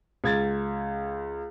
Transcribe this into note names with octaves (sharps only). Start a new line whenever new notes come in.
C#2 G#6 A6